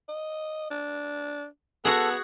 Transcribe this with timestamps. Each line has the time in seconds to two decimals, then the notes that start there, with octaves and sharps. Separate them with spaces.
0.08 D#5
0.71 D4
1.85 B3 F#4 G#4 A4